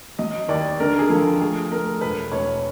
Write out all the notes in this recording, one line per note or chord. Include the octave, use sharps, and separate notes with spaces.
F#3 D#5
D#2 D5
D3 A#4
G#4
F3 A4
A3 G#4
A3 A#4
E1 B4
E1 C#5